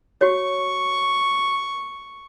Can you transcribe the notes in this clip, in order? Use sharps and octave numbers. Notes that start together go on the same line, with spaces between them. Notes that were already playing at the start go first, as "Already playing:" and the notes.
F#4 C#5 C#6